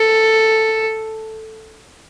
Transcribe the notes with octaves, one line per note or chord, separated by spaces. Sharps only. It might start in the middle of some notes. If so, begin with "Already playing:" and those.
Already playing: A4